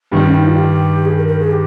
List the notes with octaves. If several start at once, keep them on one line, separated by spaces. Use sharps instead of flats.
G2 D#3 G3
C#4
D#4
F4
G4
G#4
A#4
A#4
G#4
G4